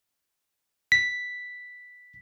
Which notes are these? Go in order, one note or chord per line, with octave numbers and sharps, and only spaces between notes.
B6